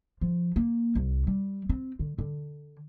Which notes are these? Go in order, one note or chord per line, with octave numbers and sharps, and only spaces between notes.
F3
A#3
C2
G3
C4
D3
D3